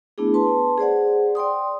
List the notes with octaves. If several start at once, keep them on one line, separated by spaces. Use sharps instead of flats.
A3 B3 D4 E4 G#4
B4 A5 C6
G#4 C5 D5 F#5
D5 G5 C6 D#6